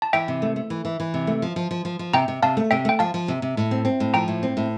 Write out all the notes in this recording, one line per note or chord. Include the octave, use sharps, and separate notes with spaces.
A5
E3 E5 G5
C3
A3
A3
E3
E3
E3
C3
A3
F3
F3
F3
F3
F3
C3 G5 A#5
C3
C3 F5 A5
A3
C3 E5 G5
A3 G5
F3 F5 A5
F3
C3
C3
A2
C4
C4
A2
F3 G5 A#5
A2
C4
A2